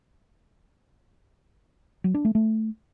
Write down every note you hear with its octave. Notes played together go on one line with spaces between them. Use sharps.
F#3
D4
A3
A3